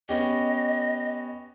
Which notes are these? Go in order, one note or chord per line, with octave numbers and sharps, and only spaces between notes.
B3 C#4 G4 D#5